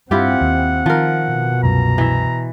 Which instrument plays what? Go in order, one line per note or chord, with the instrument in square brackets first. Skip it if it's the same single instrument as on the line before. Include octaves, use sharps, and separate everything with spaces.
[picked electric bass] G2 [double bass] C4 [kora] E4 F4 G4 [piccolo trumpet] F#5
[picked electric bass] D#2
[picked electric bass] D#3 [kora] F3 A#4
[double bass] B2
[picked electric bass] C2 F#2 [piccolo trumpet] A#5
[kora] E3 E5